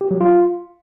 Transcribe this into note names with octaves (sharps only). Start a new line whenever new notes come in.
G4
F#3
F4